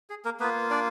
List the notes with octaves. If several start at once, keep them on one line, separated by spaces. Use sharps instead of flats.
G#4
A#3 A#4
A#3 B3 F4 B4
D4 D5